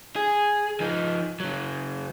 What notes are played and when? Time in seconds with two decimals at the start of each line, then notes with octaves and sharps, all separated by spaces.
0.16 G#4
0.80 F3 D#4
1.40 C#3 F#3